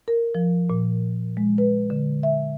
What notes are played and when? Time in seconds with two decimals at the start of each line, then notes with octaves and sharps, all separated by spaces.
0.08 A#4
0.35 F3
0.70 A#2
1.37 G#3
1.58 B4
1.90 D3
2.23 E5